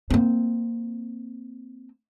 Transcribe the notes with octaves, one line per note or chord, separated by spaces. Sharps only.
A#3 C4